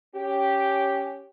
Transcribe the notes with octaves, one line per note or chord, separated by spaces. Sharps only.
C#4 G4